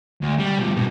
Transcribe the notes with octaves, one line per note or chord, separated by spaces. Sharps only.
D2
G3
G2 B2
F2 B2